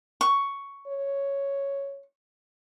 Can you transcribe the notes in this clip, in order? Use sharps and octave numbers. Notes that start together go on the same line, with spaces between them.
C#6
C#5